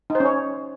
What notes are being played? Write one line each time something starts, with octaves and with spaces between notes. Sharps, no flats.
D#4
C5
C#4
C#5